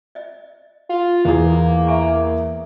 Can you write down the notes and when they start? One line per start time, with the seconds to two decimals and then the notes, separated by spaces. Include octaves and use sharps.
0.15 D5 D#5
0.89 F4
1.25 E2 A#3 G#4 D#5
1.87 E5 G#5 C#6